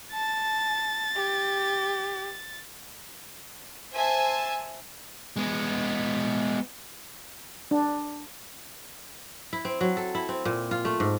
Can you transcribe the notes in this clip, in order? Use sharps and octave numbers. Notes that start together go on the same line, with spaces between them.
A5 A6
G4
C5 E5 G#5 A5
G#3 B3
D4
E4
C4
F#3
A4
E4
C4
A#2
F4
A3
G#2